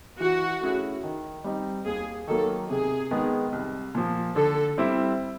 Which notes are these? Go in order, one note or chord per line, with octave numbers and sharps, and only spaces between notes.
E3 F#4
A3 C#4 E4 G#4
D#3
G3 C4 D#4
D#2 G#4
D#3 F#3 A#3 A4
C3 G#4
D#3 G#3 B3
C2
A#2 F3
D3 A4
G3 C4 E4